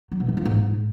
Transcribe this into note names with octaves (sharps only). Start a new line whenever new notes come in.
F#3
B2
E3
F3
G#2